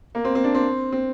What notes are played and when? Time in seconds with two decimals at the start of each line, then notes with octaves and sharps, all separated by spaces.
0.15 A#3
0.25 C4
0.35 C4
0.44 D4
0.55 C4
0.92 C4